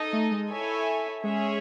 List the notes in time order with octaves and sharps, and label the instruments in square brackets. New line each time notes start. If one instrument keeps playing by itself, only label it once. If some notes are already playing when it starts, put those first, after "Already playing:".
Already playing: [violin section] D#4 A4 D#5
[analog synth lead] A3
G#3
[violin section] E4 A4 C#5 E5 G#5
[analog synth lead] G#3 [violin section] C#4 G#4 C#5 E5